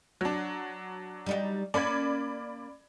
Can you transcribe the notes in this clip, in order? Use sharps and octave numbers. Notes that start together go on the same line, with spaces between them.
F#3 D4
G3 D#4 G4
A#3 C#4 A#4 D5 B5 G#6